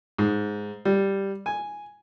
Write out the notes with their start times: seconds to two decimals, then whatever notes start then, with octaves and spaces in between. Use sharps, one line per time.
0.19 G#2
0.85 G3
1.46 G#5